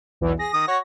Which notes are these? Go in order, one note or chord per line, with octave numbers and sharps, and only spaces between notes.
B1 E2 E3
G#4 A#6
D#3 D#6
F#4 C#5